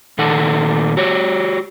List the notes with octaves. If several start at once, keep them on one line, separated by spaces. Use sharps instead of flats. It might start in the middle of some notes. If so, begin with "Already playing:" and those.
A#2 D#3 A3 D#4 A4 F#5
F#4 G4 C#5